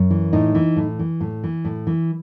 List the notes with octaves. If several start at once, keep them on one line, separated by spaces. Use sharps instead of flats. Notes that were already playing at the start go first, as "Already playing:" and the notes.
Already playing: F#2
E3
A2 D#4
E3
A2
E3
A2
E3
A2
E3